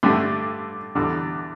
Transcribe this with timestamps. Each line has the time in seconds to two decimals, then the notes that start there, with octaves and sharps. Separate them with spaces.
0.03 G2 D3 A3 D4 G4
0.95 E2 D3 G3 D4